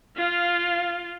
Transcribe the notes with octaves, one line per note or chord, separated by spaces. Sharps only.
F4 F5